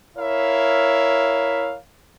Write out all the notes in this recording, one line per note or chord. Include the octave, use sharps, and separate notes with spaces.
E4 A#4 C#5 E5 F5